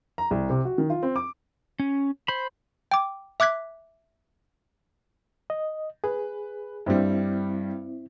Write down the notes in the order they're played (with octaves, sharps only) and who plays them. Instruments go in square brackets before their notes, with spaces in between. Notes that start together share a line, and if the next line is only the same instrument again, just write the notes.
[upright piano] A#5
C2
C3
F#4
D#3
F4
C4
D6
[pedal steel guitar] C#4
C5 B5
[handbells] G5 D6
E5 D6 F#6 G#6 B6
[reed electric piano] D#5
[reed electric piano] G#4 [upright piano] B4
[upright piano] G2 G3 [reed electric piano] C4 E4